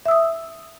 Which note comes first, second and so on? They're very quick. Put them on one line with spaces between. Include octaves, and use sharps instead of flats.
E5 E6 D#6